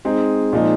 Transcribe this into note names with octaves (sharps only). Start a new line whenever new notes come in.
G#3 C4 D#4 G#4
A#2 F3 G#3 D#4